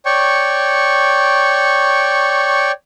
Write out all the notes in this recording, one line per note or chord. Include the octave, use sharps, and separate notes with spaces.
C#5 D5 G5 C#6